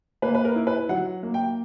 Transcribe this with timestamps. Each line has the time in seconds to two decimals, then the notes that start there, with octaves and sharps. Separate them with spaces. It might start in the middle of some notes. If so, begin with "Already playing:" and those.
0.22 A#3 B4
0.35 B4
0.45 A#4
0.56 E4
0.67 B4
0.89 F#3 F#5
1.23 A#3
1.34 G5